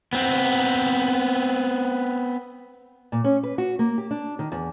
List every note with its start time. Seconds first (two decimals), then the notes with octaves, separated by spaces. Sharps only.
0.13 B3 C4
3.12 A#2
3.24 C#4
3.43 B4
3.58 F#4
3.79 A#3
3.98 G4
4.11 D4
4.39 D#3
4.52 E2